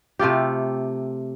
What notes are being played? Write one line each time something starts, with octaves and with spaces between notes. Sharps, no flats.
C3 A3 F4 G4